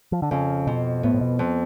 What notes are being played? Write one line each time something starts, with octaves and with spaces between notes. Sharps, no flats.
F3
D3
F2 C#3
B2 F3
A2 B3
A2
B2
F2